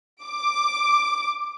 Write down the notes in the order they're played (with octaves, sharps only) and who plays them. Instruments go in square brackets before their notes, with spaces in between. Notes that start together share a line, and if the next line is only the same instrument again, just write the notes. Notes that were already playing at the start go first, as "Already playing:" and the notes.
[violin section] D6